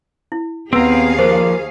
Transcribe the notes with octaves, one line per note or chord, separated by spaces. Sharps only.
E4
D#2 B3 C4 G#4 F5 A#5 E6
F3 A#4 C5 D5